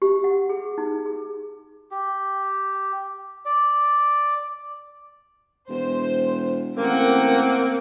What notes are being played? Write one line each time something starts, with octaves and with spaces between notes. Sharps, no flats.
G4
F#5
G#4
D#4
G#4
G4
D5
E1 C5
A1 A#3 C4 A#4 F#5